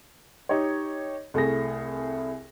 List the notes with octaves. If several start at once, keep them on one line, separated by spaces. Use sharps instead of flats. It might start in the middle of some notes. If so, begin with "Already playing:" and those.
D#4 G4 C#5
C2 A3 E4 G#4 A#6